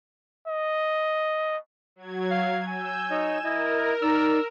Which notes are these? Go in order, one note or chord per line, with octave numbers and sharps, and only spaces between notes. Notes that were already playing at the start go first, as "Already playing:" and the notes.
D#5
F#3 G#6
F5
G#5 E6 G6
D#4 C#5 D#5 E7
E4 A#4 D#5
D#4 D5 E6